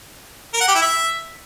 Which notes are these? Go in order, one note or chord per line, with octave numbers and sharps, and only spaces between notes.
A#4
F#5
G4
E4
E5